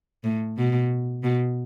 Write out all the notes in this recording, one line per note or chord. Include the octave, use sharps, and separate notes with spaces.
A2
B2
B2